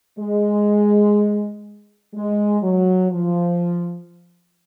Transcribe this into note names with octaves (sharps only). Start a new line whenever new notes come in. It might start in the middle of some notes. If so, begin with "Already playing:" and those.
G#3
G#3
F#3
F3